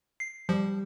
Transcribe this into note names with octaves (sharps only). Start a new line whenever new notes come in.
C7
F3 G3